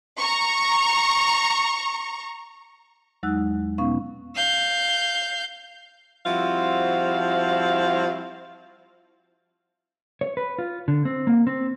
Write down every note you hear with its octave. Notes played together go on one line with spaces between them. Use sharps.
A#5 C#6
E2 F#3 G#3 D#4 E6 F#6
B2 B3 C#4 D#4 F5 C#6
F5 G6
F3 G3 C4 E4 F#4 F5
C#5
B4
F4
D3
C4
A#3
C4